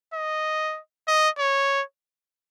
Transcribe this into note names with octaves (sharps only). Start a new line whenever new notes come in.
D#5
D#5
C#5